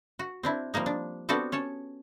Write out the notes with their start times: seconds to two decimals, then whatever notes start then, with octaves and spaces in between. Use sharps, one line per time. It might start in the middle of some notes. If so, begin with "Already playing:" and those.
0.19 F#4
0.43 C4 D4 E4
0.74 F3 G3 A#3 D#4
0.86 D4
1.29 B3 C4 D4 F#4 G4 A4
1.52 C#4 C#5 A5